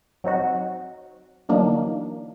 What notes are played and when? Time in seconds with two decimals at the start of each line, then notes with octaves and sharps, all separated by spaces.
0.24 F#3 C4 D#4 F#4
1.49 D3 E3 F#3 A#3 D4 D#4